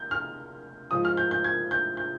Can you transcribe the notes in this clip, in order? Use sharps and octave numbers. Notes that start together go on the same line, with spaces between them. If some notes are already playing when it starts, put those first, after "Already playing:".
Already playing: G6
F6
G#2 F3 D#6
F6
G6
G6
G#6
G6
G6